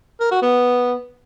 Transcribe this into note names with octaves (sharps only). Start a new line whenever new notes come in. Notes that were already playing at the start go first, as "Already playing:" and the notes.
A#4
F#4
B3